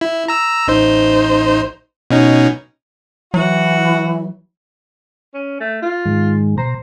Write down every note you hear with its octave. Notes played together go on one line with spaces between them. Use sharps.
E4
A#5 E6
A1 D#4 C5
B2 C#4 D#4
E3 F#3 F#4 F#5
C#4
A3
F4
G#2 D#3 G#3
B2 C5 A#5